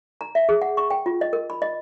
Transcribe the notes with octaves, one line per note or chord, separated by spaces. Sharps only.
A#5
E5
G#4
F#5
C#6
G5
F4
D#5
A#4
B5
D#5